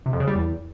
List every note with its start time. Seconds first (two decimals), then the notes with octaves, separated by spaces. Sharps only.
0.06 C3
0.13 F2
0.20 C#3
0.27 G3
0.35 E2